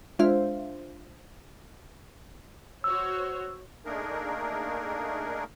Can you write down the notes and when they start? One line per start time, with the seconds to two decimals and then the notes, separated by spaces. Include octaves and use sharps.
0.19 G#3 D4 F4 C5 E5 F5
2.84 F#4 C5 C#5 E6
3.85 A3 A#3 D4 D#4 G#4 A#4